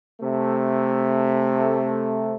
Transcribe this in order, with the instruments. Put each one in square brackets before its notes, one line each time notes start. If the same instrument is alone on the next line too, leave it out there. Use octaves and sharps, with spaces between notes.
[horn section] C3 A3